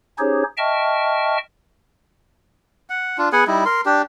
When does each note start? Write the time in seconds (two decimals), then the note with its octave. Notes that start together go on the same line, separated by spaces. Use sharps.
0.19 C#4 D#4 G4 G#4 C5 C#5
0.58 D#5 E5 G5 A5 C#6 F6
2.90 F#5
3.18 D4 F4
3.32 B3 G#4 F#5 G#5
3.47 G3 D#4 E4
3.66 A#4 C6
3.86 D4 G4